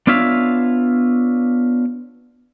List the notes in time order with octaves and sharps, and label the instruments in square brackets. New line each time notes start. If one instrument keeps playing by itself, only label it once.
[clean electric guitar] B3 D4 F4 C#5 E5 F5